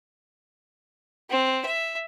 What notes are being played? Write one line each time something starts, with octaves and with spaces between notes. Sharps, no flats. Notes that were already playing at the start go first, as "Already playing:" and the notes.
C4
E5